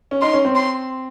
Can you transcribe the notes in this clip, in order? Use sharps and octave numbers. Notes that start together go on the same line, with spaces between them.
C#4
D#4 C6
C#4
C4
C6